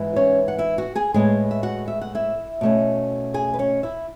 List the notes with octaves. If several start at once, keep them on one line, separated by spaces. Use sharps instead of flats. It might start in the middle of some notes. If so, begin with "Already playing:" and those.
Already playing: G#2 E3 B3
C#4 C#5
F#5
E4 E5
F#4 F#5
G#4 G#5
A2 G#3 B3 G#4 G#5
E5
F#4 F#5
E5
F#5
E4 E5
B2 A3 C#4
G#4 G#5
B4
C#4 C#5
E4 E5